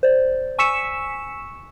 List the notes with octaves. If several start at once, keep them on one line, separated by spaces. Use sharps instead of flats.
C5 D5
G#5 C#6 E6 B6 C#7 E7